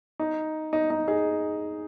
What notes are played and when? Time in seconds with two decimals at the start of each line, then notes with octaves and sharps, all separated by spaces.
0.19 D#4
0.73 D#4
0.90 D#4
1.08 D#4 G#4